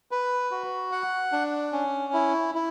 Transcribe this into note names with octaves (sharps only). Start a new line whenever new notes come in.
B4
F#4
F#5
D4
C#4
E4
E4